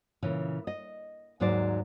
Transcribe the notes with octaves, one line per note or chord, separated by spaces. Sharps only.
A#2 C#3 E3
D#5
D#2 G#2 F#3 D#4 C5 D5